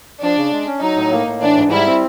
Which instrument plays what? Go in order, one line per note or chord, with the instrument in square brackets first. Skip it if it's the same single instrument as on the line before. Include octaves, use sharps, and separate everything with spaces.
[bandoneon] F3 [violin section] D4
[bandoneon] C#3
G#3
C#4
[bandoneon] F#3 [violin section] D#4
[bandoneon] A2
A#3
A2
[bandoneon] E3 [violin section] D4
[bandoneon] G#2
[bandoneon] G3 [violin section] E4
[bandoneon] C4